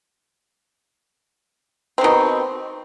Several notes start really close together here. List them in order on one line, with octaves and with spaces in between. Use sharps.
C4 D#3 B2